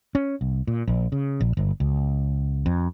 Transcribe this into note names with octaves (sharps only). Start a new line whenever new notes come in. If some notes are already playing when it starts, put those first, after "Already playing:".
C#4
C2
A#2
A#1
C#3
A#1
G1
C#2
F2